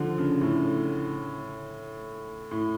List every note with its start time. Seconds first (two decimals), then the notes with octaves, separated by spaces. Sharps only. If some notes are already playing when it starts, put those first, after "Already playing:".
Already playing: D3 F3
0.18 C#3
0.41 A2
2.51 A2